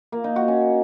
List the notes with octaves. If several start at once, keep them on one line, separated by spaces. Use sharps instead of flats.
A#3
D#4
F#4
C#4